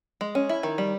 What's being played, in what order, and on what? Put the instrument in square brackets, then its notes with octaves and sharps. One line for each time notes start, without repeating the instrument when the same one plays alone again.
[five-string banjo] G#3
C#4
E4
D#3
G3